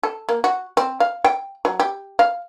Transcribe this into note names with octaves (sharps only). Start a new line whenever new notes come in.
A4
A#3
F#4
C4
F5
G5
F#3
G4
F5